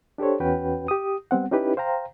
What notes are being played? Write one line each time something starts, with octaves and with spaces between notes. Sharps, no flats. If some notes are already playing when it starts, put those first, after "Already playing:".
D4 G4 A4 C5 C#5
E2 C#4 F#4 B4 G5
G4 D#6
G3 B3 C4 F#5
C#4 D#4 E4 G4 B4
C5 F5 G5 A#5